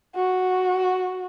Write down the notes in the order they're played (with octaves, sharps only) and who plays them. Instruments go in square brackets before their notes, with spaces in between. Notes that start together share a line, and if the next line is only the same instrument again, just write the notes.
[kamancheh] F#4